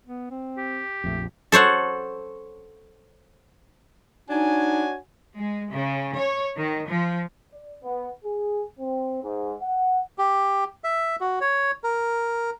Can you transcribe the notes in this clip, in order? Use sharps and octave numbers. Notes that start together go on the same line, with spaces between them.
B3
C4
G4
A#1 F2 A3
A4 C5 C#5 F#5
D4 D#4 F#4 C#5 G#5
G#3
C#3
C#5
D#3
F3
D5
B3
G#4
C4
G#2
F#5
G4
E5
F#4
C#5
A#4